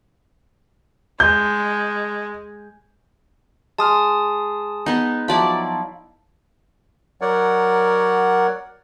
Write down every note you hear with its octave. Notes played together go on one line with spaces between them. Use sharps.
G#3 G6
G#3 A5 D#6 F6
B3 D#4 F#5 B5
F3 F#3 D#4 E4 D5 B5
F#3 A#4 C#5 D5 F#5